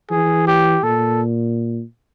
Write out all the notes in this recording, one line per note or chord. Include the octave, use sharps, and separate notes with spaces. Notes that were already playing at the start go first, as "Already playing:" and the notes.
E3 G#4
G4
A#2 A4